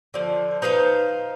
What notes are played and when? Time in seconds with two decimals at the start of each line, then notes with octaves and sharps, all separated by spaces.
0.14 D3 F3
0.62 D#4 B4 C5 F5